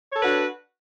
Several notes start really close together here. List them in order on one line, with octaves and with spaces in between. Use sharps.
C#5 A4 B4 F#4 D4